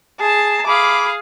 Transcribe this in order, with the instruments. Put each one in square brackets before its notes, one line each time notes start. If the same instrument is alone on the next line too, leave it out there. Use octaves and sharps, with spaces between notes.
[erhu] G#4 [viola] A5 [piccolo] C7
[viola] G#4 F5 [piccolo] B5 [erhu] D6